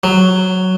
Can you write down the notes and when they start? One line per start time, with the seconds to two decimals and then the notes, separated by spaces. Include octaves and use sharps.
0.04 F#3